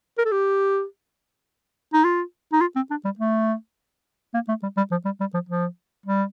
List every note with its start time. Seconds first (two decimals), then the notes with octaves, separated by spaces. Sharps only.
0.18 A#4
0.25 A4
0.32 G4
1.93 D#4
2.04 F4
2.52 D#4
2.61 F4
2.75 C4
2.90 D4
3.05 G3
3.19 A3
4.34 A#3
4.48 A3
4.63 G3
4.77 G3
4.91 F3
5.05 G3
5.20 G3
5.34 F3
5.49 F3
6.06 G3